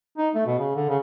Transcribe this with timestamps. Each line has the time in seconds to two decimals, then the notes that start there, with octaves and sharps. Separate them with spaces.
0.18 D#4
0.35 A3
0.46 B2
0.59 C#3
0.75 D3
0.89 C#3